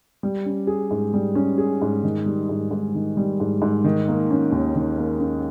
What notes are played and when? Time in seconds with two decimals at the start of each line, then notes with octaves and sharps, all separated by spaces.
0.23 G3
0.46 C#4
0.67 G#4
0.91 G#2
1.14 G3
1.35 C#4
1.58 G#4
1.82 G#2
2.03 D#3
2.26 G3
2.49 G#2
2.71 G#2
2.95 D#3
3.17 G3
3.40 G#2
3.62 G#2
3.84 D#3
4.08 A#3
4.31 C#4
4.52 D#2
4.75 D#3
4.98 A#3
5.20 C#4